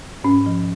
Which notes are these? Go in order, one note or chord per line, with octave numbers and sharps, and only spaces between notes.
G#2 C#4
F3